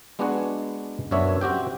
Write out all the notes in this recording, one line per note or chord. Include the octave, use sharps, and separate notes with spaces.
G#3 B3 D4 F#4 G#4 F#5
F#2 B3 D4 C#5 E5
C4 F#4 G4 G5